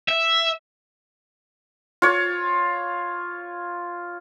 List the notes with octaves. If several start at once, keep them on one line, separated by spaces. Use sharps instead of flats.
E5
F4 C#5